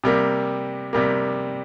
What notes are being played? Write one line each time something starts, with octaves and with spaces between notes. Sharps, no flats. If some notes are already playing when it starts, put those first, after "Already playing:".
C3 G3 A#3
C3 G3 A#3